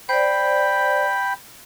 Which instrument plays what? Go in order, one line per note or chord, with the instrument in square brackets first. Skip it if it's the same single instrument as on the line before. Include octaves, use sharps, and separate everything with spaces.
[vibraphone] C5 D5 [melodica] G5 B5